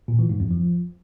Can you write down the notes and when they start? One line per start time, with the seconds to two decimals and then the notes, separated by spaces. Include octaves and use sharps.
0.08 A#2
0.19 E3
0.29 G#2
0.40 F2
0.51 F3